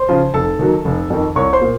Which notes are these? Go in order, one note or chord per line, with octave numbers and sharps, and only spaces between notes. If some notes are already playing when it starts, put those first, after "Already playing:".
Already playing: C5 C6
C#3 F3
F1 A4 A5
D#2 D#3 F#3
F1
F2 D#3
C2 C#5 C#6
C5 C6
A#2